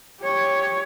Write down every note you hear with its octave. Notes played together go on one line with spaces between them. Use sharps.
G4 C#5